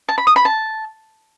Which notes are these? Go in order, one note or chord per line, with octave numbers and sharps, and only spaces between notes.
A5
B5
D#6
B5
A5